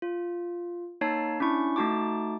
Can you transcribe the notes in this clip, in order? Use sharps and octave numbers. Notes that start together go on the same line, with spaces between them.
F4
A#3 D#4 C#5 A5 C7
C#4 D4 E4 C#6
A3 D#4 F#4 A5 D6